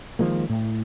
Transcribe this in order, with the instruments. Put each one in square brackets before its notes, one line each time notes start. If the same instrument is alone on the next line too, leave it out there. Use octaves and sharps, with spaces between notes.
[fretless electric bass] D#3 F3 G#3 A#3
A2